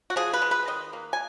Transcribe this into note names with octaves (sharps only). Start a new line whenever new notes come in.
F#4
F3 G#4
B4
G#3
B4
D#3 D#5
A#3
G#5